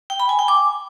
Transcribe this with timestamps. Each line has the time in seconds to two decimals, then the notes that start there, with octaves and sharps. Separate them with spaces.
0.10 G5
0.20 B5
0.29 G#5
0.39 G5
0.48 D6